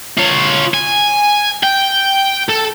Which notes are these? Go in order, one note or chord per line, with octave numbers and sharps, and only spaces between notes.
F4 C#5
G#5
G5
A4